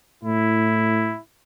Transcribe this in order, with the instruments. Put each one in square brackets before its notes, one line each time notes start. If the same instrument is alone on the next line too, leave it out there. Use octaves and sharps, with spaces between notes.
[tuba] A2 [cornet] E4